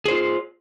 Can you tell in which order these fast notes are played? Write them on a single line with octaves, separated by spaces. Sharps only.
G#4 C5 F4